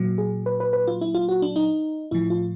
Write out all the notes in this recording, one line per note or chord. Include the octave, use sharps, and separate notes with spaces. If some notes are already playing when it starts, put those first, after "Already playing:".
Already playing: A#2 F#3
G#4
B4
B4
B4
F4
E4
F4
F#4
D4
D#4
A2 F3 E4
F4